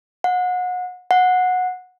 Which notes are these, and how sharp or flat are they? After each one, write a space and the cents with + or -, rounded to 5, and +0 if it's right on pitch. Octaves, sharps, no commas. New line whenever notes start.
F#5 -30
F#5 -15